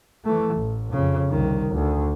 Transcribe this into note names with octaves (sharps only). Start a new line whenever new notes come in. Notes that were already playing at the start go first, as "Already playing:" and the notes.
E3 A3
A1
F2 C#3
C2 D#3
D2